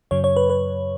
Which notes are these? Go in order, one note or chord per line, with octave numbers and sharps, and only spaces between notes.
F#2 C#3 F#3 C#5
C#5
B4
B4